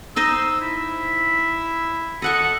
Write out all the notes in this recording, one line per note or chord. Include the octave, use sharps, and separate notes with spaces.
D#4 C5 D#5 E6
E4
A4 D#5 F#5 C#6